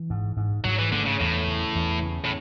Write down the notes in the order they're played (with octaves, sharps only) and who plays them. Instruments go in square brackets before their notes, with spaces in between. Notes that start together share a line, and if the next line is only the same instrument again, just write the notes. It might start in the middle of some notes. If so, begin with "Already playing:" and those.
Already playing: [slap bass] E3
G#2
G#2
[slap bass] G#2 [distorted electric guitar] F#3
[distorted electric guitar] E3
[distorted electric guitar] D3 [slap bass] A3
[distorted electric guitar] C#3
[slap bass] E2 [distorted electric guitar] A2
[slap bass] C#3
E2
C#3
[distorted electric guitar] A2